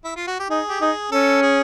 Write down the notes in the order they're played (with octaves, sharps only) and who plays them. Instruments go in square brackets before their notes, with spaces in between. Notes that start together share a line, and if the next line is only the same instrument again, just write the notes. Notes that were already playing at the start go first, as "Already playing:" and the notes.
[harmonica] E4
F4
F#4
G4
[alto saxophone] D#4 [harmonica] G#4
[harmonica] G4
[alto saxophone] D#4 [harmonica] G#4
[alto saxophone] C#4 [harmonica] A4
[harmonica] G#4